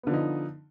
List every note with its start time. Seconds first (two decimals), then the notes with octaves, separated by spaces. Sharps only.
0.03 B3
0.07 D3
0.10 F3
0.14 D#4